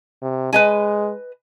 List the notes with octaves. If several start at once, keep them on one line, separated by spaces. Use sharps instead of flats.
C3
G#3 B4 D#5 G#5